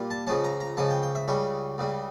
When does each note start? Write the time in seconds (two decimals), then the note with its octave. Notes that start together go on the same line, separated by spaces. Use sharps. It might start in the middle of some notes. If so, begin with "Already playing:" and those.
Already playing: A#2 G3 F4
0.10 A5
0.27 C#2 C#3 F3 C#4 A5
0.44 A#5
0.60 A#5
0.77 C#2 C#3 F3 C#4 A5
0.90 G5
1.03 G5
1.15 E5
1.28 C#2 C#3 G3 C#5
1.78 C#2 C#3 G3